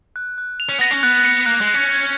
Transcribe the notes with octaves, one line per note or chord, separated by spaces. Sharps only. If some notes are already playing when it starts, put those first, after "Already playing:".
F#6
F#6
F7
C#4
B3 A#6
C#4
B3 F#6
C#7
A#3 F#6
G#3
F#6
C#4
G#6